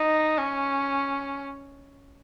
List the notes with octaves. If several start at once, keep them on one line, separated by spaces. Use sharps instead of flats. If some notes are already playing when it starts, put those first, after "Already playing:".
Already playing: D#4
C#4